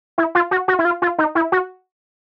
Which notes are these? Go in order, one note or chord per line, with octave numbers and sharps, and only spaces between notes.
E4
F4
F#4
F#4
E4
F4
F4
D#4
E4
F#4